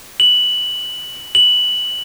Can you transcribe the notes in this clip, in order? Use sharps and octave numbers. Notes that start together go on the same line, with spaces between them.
F#7
F#7